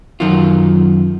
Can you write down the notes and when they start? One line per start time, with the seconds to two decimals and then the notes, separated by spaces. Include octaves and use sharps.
0.20 F#2 D#3 F4